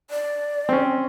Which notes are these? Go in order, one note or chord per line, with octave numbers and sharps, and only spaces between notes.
D5
C4 C#4